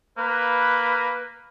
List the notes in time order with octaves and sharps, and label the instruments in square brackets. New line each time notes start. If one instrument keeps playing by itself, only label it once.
[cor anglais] A#3 [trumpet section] B4